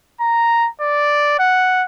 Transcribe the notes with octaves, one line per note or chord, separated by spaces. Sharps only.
A#5
D5
F#5